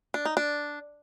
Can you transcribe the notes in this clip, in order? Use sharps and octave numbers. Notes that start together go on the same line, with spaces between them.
D4
D#4
D4